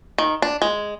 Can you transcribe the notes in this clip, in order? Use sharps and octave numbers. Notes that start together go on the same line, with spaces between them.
D#3
D4
G#3